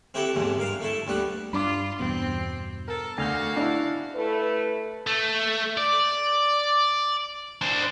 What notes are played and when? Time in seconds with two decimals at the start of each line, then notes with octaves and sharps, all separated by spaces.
0.14 C4 E4 F#4 G4 A4 G5
0.34 B1 E2 G#2 C3
0.59 G2 A#4 F5
0.81 A3 E4 A4
1.07 D2 G3 B3 F#5
1.53 G2 D4 F4 B5 D6
2.00 E2 G2 B2 C4
2.88 A4 A#4
3.18 D2 F#4 F5 G#5 F6 G6
3.56 D4 E4
4.15 A3 E4 A4 B4
5.07 A3
5.77 D5
7.62 D4 C5